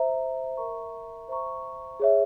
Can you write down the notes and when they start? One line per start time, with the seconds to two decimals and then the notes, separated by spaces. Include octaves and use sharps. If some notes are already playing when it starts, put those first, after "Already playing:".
Already playing: C5 E5 A#5
0.57 A#4 E5 A#5 C#6
1.28 C5 E5 A#5 C#6
2.00 G#4 C#5 E5